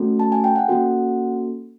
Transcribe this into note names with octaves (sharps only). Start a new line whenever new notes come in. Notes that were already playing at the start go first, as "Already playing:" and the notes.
Already playing: A3 C#4 F#4 A4
A5
G#5
G5
F#5
A#3 C#4 F#4 A4